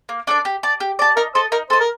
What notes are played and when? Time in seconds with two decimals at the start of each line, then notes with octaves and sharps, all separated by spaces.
0.09 A#3
0.27 D4 A4 D5
0.45 G4
0.63 D5 A5
0.80 G4
0.99 D5 A5
1.16 D#4 A#4
1.35 A4 C5 D#5
1.52 D#4 A#4
1.70 A4 C5 D#5
1.80 A#4